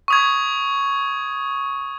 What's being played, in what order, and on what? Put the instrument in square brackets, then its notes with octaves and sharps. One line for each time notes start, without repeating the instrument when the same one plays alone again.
[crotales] C#6 D#6 G#6